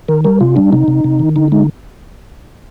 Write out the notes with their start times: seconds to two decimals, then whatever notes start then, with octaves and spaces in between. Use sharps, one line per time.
0.08 D#3 A#4
0.24 G3 A#4
0.41 C3 F4
0.56 G3 D4
0.72 C3 D#4
0.88 C3
1.04 C3
1.20 D#3
1.36 D3 D#4
1.52 G#3 D#4